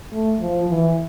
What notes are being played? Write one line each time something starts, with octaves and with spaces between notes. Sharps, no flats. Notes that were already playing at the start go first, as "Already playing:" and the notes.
A3
F3
E3